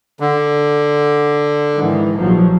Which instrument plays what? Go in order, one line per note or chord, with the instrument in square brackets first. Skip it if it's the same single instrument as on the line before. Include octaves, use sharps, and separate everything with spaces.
[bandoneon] D3
[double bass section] G#2 D#3 E3
A#1 F3 F#3